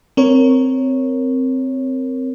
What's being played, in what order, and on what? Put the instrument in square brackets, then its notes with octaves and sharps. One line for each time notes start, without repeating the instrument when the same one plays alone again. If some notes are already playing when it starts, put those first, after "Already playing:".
[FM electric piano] C4 A#4 C#5